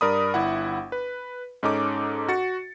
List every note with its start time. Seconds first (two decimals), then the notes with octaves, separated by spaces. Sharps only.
0.01 G2 A#4 D5 B5 D#6
0.34 G1 E4 F#5
0.92 B4
1.63 G#2 C#4 D#4 A4 D6
2.28 F#4 A6 C#7